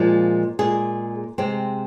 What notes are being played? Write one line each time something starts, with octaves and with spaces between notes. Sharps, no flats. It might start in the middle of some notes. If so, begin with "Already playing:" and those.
Already playing: A#2 F3 G#3
A#2 G#3 G#4
C3 G#3 C4